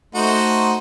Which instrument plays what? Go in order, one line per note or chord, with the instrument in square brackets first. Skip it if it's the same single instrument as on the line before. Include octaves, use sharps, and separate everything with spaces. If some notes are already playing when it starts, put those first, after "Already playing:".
[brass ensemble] A3 [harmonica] D#4 F#4 C5